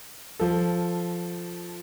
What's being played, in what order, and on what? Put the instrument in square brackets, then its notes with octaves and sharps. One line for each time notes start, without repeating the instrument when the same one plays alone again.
[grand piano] F3 A4